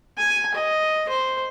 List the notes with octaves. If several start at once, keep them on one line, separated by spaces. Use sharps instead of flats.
G#5
D#5
C5